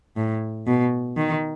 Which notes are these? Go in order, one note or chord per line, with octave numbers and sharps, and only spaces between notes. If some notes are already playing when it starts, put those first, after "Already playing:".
A2
B2
D#3